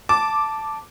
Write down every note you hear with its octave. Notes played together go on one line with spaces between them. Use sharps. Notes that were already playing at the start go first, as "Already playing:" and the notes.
A5 D6